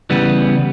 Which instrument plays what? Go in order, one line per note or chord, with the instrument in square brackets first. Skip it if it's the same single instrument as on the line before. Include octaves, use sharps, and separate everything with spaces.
[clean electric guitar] C#3 E3 G3 B3